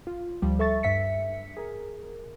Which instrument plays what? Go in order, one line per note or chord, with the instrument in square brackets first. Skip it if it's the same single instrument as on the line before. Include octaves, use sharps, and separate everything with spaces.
[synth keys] F4
D2 F3 G3
A4 E5 C#6 A6
G2 E5 B6 C#7
G#4 A#4